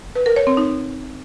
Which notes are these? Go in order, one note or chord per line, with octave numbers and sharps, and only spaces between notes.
B4
A#4
C#5
C4
D#4